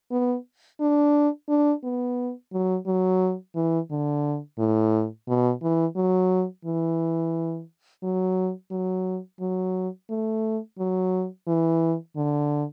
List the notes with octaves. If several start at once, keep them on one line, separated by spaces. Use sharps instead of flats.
B3
D4
D4
B3
F#3
F#3
E3
D3
A2
B2
E3
F#3
E3
F#3
F#3
F#3
A3
F#3
E3
D3